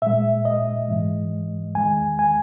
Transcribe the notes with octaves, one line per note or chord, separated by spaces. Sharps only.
A#2 G#3 E5
D#5
G#2 E3 G#3
E2 D#3 G#3 G#5
G#5